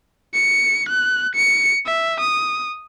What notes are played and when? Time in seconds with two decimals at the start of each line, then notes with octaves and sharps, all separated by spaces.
0.34 C#7
0.89 F#6
1.36 C#7
1.86 E5
2.21 D#6